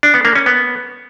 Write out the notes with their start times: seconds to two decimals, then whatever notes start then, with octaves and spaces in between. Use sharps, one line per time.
0.03 D4
0.14 B3
0.25 A#3
0.35 C#4
0.46 B3